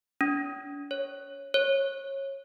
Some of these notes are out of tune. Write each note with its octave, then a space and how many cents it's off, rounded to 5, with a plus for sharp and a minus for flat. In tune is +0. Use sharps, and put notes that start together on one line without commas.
C#4 +45
C#5 -10
C#5 -25